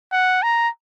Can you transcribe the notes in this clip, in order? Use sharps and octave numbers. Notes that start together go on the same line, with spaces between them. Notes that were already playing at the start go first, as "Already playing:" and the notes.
F#5
A#5